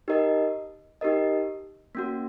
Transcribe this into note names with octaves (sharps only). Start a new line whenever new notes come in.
D#4 G4 A#4 D#5
D#4 G4 A#4 D#5
A#3 C#4 F#4